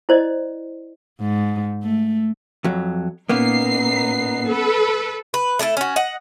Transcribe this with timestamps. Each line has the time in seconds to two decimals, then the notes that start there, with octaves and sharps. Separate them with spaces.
0.09 E4 C5 D5 D#5
1.20 G#2
1.83 A3
2.64 F2 F#3
3.29 A#2 A#3 B3 C#4 D#4 C7
4.47 A4 B4
5.34 B4
5.59 A3 D4 E4 A4
5.77 C#4 F#4
5.96 D#5 F#5